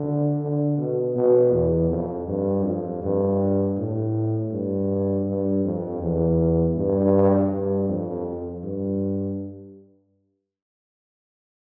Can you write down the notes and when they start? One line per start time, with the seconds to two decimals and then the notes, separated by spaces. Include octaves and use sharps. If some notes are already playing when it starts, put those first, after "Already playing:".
Already playing: D3
0.41 D3
0.78 B2
1.16 B2
1.52 E2
1.90 F2
2.28 G2
2.65 F2
3.02 G2
3.78 A2
4.52 G2
5.27 G2
5.65 F2
6.02 E2
6.76 G2
7.51 G2
7.89 F2
8.63 G2